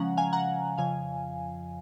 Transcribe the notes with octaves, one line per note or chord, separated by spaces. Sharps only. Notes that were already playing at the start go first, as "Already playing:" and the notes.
Already playing: C#3 F3 G#3 C#4 F#5 A#5
F5 G#5
F#5 A#5
F2 C#3 F3 F5 G#5